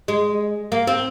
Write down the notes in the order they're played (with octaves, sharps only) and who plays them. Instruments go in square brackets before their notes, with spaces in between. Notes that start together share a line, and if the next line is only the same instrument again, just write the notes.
[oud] G#3
A#3
C4